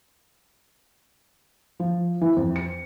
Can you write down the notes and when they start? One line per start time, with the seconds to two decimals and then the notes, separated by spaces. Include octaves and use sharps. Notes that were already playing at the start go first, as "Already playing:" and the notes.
1.80 F3
2.21 E3
2.36 F2
2.56 C#7